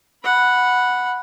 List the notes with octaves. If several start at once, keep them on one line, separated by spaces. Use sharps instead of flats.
F#5 B5